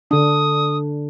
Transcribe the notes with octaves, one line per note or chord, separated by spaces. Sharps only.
D3 D4 D#6